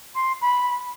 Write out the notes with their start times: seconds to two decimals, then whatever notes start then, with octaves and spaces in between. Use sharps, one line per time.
0.15 C6
0.41 B5